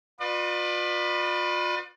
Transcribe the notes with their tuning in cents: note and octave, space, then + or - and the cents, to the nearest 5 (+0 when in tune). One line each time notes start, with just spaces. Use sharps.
F4 +35 B4 +0 D5 +40